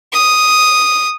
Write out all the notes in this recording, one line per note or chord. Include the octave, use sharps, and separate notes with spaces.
D#6